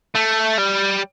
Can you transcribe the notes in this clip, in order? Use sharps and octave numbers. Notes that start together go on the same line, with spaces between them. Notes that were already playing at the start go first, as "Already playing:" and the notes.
A3
G3